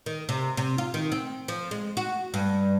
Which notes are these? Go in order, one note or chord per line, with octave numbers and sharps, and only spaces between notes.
D#3
C3
C3
F4
D#3
C4
F3
G#3
F#4
G2